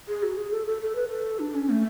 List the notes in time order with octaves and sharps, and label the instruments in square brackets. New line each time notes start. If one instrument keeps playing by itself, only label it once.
[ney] G#4
F#4
G#4
A4
A4
A4
B4
A4
D4
C#4
A3